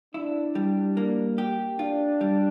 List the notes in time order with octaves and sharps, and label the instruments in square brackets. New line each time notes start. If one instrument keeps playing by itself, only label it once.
[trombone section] D4 [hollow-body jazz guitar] E4
[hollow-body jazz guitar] G3
A#3
G4
[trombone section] D4 [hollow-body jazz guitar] F4
[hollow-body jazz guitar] G3